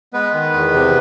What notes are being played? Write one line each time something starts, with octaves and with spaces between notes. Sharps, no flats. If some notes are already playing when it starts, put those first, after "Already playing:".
G#3 B3 B4
D#3
E2
C3